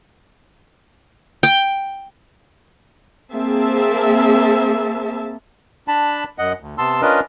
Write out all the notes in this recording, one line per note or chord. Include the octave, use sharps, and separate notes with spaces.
G5
A#3 C4 G#4 E5 A5
D4 A5 B5
F#2 D#5 F#5
D2
C3 B3 A5 C6 E6
C#4 D4 F4 A#4 B4 D#5